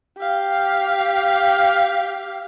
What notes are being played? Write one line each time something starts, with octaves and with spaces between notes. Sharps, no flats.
G4 F5